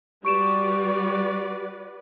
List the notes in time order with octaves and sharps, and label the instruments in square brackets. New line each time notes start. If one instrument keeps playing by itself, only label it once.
[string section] G3 [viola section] F#4 B4 D5 [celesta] C#6 D7 E7